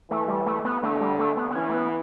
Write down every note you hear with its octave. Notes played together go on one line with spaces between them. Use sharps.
E3 A3
G3
A3
B3
D3 A3
G3
A3
B3
B3
E3 C#4
A3
B3